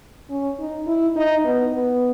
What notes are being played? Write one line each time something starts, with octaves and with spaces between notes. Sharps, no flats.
C#4
D#4
E4
D#4
B3
B3